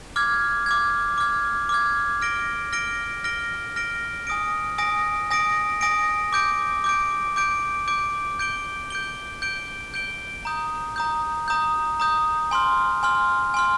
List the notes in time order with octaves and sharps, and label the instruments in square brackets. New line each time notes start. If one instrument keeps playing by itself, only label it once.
[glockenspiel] D6 F6 G#6
D6 F6 G#6
D6 F6 G#6
D6 F6 G#6
F6 A#6 D7 G7
F6 A#6 D7 G7
F6 A#6 D7 G7
F6 A#6 D7 G7
G#5 D#6 A#6 D7
G#5 D#6 A#6 D7
G#5 D#6 A#6 D7
G#5 D#6 A#6 D7
D6 G6 D7
D6 G6 D7
D6 G6 D7
D6 G6 D7
G6 D7 G7
G6 D7 G7
G6 D7 G7
G6 D7 G7
A#5 D#6 G6
A#5 D#6 G6
A#5 D#6 G6
A#5 D#6 G6
G#5 C6 F6
G#5 C6 F6
G#5 C6 F6